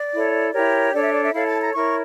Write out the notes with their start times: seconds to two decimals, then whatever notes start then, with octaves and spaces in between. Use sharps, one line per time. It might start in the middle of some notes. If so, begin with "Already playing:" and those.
Already playing: D5
0.13 E4 A4 C#5
0.53 E4 G4 A#4 C#5
0.94 D4 A4 C#5 D5
1.03 E5
1.14 D5
1.24 E5
1.33 E4 A4 C#5 F5
1.47 A5
1.61 A#5
1.73 E4 A#4 C#5 C#6